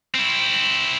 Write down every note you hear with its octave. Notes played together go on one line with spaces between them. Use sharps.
C4 E4